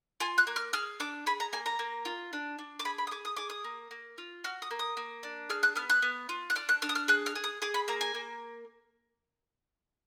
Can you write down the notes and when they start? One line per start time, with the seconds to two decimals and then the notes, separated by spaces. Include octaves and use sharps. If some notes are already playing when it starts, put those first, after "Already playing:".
0.20 F4 G#5
0.38 F#6
0.47 A#3
0.56 F6
0.73 G#4 F6
1.00 D4 D6
1.26 G#4 B5
1.40 A#5
1.53 A#3 G#5
1.66 A#5
1.79 A#3
2.05 F4
2.33 D4
2.59 D4
2.79 D6
2.85 G#4 B5
2.98 B5
3.07 D#6
3.11 G#4 D6
3.25 D#6
3.36 G#4 D6
3.50 D#6
3.64 A#3
3.91 A#3
4.18 F4
4.44 F#4 F6
4.62 D#6
4.71 A#3
4.79 D#6
4.97 A#3
5.23 D4
5.50 G#4 F6
5.63 F#6
5.76 B3 F6
5.89 F#6
6.02 B3
6.29 F4
6.50 F#6
6.56 D4 F6
6.69 F#6
6.82 D4 F6
6.89 D#6
6.95 F6
7.08 G#4 F#6
7.26 F6
7.35 G#4
7.44 D#6
7.62 G#4 D6
7.74 B5
7.88 A#3 A#5
8.01 G#5
8.15 A#3